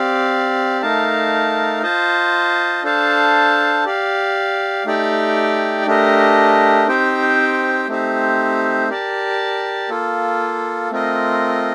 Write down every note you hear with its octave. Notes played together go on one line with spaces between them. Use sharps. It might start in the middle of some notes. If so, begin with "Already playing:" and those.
Already playing: C4 G4 D5 F5
A3 D#4 A#4 F5 A5
F4 C5 D#5 A5
D4 A4 C5 F5 A5
G4 D5 F5
A3 D#4 G4 D5 G5
A3 D4 G4 A#4 D#5
C4 D#4 G4 C5 G5
A3 C4 D#4 G4 C5
G4 A#4 D5 A5
A#3 F4 A4
A3 C4 F4 A#4 D#5